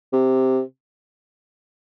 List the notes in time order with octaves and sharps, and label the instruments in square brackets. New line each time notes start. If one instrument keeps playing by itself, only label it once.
[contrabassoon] C3